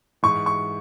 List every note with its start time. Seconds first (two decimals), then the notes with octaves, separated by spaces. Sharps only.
0.23 G#2 E3 C#6
0.46 C#6